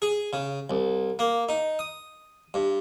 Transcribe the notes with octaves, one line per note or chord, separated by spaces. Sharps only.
G#4
C#3
C2
A#3
D#4
D#6
G2